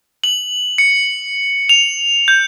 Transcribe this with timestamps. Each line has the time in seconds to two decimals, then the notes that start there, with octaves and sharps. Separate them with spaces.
0.24 F#7
0.78 C#7
1.69 F7
2.28 G6